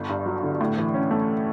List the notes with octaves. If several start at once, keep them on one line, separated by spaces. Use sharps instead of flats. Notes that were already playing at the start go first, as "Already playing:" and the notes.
Already playing: G1
G2
F#3
D3
A2
E3
C#4
A3